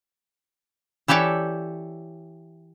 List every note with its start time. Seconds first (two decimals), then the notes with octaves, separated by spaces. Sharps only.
1.08 E3 G4 A4 C#5 D5 E5